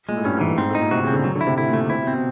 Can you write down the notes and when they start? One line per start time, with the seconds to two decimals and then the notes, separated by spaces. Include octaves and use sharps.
0.09 A#2 G#3
0.17 A2
0.24 G2 C#4
0.36 G#2 E3
0.47 A2
0.58 G#2 C4
0.69 A2
0.75 D#4
0.80 A#2
0.91 C3 F#4
1.03 C#3 C4
1.13 D3
1.24 F#3
1.35 D3
1.41 E4
1.47 C3
1.58 A2 E4
1.68 A#2
1.73 A3
1.80 A#2
1.90 C3 E4
2.01 B2
2.07 C4
2.12 B2